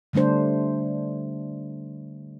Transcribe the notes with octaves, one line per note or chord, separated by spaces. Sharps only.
D3 G3 A3 D4 C5